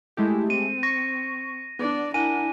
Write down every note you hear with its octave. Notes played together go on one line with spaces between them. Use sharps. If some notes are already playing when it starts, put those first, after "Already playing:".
G#3 A3 E4 G4
C4 D#7
C#6 A#6
B3 D4 D5
D4 E4 A#4 F#5 G#5 D#7